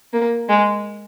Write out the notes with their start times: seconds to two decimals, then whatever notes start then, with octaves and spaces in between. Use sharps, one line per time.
0.13 A#3
0.49 G#3